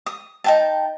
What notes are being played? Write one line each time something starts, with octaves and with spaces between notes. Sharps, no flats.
D#6
D#4 G5 A5